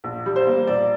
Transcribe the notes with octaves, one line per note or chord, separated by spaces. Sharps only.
A#1
G3
C5
A#3
A#1 D5